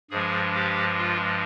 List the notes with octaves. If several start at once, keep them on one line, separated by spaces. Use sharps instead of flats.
G2 F3 G#3 G#4
G4
F4